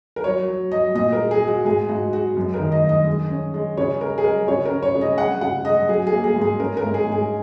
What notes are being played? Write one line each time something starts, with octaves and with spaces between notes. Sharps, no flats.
A#4
F#3 C#5
F#3
F#3 D#5
A#2 D#5
A#4
G#3
G#4
G#3
F#4
G#2 G#4
G#2 F#4
G#3 F#4
F#2
A#4
D#3
D#5
D#3
D#5
G#3
C#4
G#3
C#3 C#5
G#3 A#4
G#4
G#3 A#4
C#3 C#5
A#4
C#4
C#5
C#3
D#5
G#3 F#5
C#3 F#5
G#3 D#5
F#3 G#4
G#4
A#3
G#4
G#2
G#4
C#4 A#4
A#4
G#2
G#4
G#2
G#4